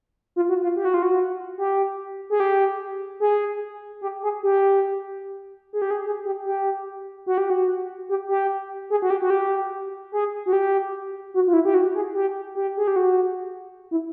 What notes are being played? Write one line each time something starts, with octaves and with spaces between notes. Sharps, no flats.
F4
F#4
F4
G4
F#4
F4
F#4
G4
G#4
G4
G#4
G4
G#4
G4
G#4
G4
G#4
G#4
G4
G4
F#4
G4
F#4
G4
G4
G#4
F#4
G4
F#4
G4
G#4
F#4
G4
F#4
F4
E4
G4
F#4
G#4
G4
G4
G#4
G4
F#4
E4